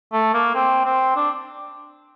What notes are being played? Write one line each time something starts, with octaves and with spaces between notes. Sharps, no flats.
A3
A#3
C4
C4
D4